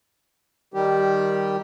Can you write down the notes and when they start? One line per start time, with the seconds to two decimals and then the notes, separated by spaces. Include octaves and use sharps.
0.74 D#3 G3 G4